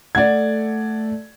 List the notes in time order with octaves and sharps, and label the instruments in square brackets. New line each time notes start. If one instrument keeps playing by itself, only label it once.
[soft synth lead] A3 [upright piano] D5 F#5 G#6